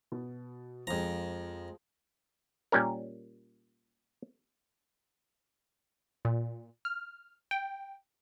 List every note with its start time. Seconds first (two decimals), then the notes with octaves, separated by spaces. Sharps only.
0.12 B2
0.87 F2 F3 G#3 A#5
2.72 A#2 G3 C#4 A#4
6.25 A#2
6.85 F6
7.51 G5